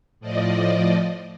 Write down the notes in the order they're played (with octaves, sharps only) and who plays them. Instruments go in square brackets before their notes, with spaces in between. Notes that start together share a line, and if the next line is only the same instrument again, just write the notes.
[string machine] A2 F3 D5 D#5